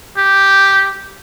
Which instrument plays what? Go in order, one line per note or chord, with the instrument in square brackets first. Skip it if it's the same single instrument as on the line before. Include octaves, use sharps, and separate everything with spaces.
[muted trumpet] G4